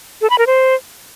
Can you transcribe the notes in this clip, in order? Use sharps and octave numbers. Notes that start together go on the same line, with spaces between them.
A4
B5
A#4
C5